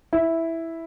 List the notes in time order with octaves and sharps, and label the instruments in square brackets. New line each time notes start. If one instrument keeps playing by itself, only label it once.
[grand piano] E4